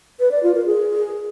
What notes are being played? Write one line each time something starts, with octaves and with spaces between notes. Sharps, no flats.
B4
D5
F4
A#4
G#4